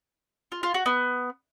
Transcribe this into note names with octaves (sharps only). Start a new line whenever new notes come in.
F4
F4
F#4
B3